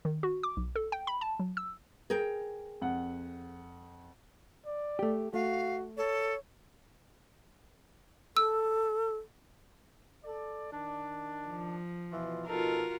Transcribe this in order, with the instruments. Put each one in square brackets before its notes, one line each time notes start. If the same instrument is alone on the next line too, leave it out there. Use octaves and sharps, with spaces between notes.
[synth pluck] D#3
F#4
D6
B1
A4
G5
B5
A5
F#3
E6
[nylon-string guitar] G#4 A#4 G5
[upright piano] F2 F#5
[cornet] D5
[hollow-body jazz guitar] A3 G4
[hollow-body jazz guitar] A3 [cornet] F#4 [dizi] F5
[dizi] A4 [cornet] C#5
[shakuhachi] A4 [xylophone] E6
[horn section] A4 D5
D#3 D4
[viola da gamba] F3
[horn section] B2 E3 F4
[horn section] B2 D#4 A4 [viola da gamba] F4 F#4 A#4